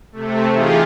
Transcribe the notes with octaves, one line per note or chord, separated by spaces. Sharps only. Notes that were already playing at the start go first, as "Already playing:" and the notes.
C3 A3
E3 D#4 F4 G4 G#4